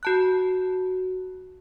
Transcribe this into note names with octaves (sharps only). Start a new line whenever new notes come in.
F#4 A5 F#6